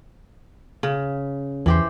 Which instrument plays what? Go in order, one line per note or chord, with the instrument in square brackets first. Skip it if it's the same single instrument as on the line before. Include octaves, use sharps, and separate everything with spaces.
[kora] C#3
[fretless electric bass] E2 [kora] E3 G4 C5